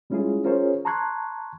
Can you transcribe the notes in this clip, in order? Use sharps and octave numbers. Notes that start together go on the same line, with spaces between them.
G3 G#3 C#4 E4 F4 G#4
C#4 F4 G#4 A#4 C5 C#5
A5 A#5 C6 C#6 F#6 G#6